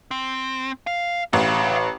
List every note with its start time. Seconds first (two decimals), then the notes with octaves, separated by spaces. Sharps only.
0.11 C4
0.87 F5
1.33 A1 E4 F5